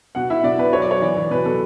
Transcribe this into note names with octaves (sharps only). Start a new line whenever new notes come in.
B2 F#5
E4 E5
B2 D5
B2 B4
F#3 C#5
D5
F#3 C#5
E3 D5
E3
B2 B4
B2 A4